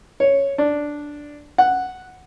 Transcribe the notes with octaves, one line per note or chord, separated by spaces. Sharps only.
C#5
D4
F#5